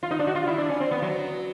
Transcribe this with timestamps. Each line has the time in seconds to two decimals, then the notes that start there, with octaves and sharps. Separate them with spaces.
0.03 F4
0.11 D#4
0.19 D4
0.27 F#4
0.35 F4
0.47 E4
0.58 D4
0.69 C#4
0.80 C4
0.91 B3
1.02 F#3